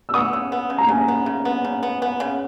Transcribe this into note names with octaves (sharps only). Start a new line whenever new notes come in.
E6
B3 D#6
C#3
B3
C#3
A#5
C#3 G#5
B3
C#3
B3
C#3
B3
B3
C#3